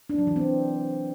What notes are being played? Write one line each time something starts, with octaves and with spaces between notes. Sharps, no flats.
D4
F#3
E3
C4